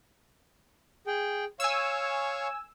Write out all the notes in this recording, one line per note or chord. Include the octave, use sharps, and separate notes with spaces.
G#4 G5
C#5 F5 G#5 C#6 E6